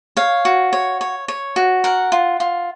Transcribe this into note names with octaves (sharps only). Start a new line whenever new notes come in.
C#5 F5
F#4
C#5
C#5
C#5
F#4
A#4 F#5
F4
F4